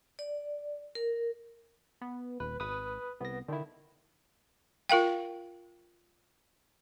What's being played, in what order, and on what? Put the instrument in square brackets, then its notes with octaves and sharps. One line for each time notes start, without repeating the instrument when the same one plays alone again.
[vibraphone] D5
A#4
[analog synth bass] B3
[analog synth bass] D#1 [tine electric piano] B4
[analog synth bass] G#1 [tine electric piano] B4 D#6
[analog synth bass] C2 [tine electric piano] B3 A#6
[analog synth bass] D3 [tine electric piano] D#3 E4
[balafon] F4 A#4 F5 G5